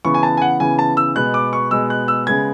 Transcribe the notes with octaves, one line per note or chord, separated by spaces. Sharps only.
C#3 E3 B3 C#6
G#5
A5
G#5
F#5
C#3 E3 B3 G#5
A5
E6
B2 G#3 B3 F#6
D6
C#6
B2 G#3 B3 E6
F#6
E6
C#3 G#3 B3 G#6